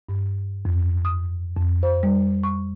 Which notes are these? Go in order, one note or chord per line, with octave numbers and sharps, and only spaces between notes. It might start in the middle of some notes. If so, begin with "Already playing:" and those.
G2
F2
D#6
F2
C5
G3
C#6